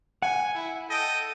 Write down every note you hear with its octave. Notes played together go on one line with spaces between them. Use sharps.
F#5 G#5
E4
A4 D#5 G5